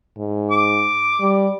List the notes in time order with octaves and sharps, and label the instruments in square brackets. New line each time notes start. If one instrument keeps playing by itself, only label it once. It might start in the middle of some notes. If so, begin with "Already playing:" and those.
[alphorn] G#2
[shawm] D6
[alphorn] G3